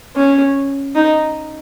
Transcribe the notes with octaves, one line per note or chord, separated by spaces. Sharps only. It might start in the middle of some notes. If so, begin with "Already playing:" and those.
C#4
D#4